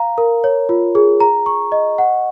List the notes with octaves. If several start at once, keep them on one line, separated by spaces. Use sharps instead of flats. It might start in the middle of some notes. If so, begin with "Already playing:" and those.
Already playing: F5 A#5
A#4
C#5
F4
G#4
A#5
C#6
D#5
F#5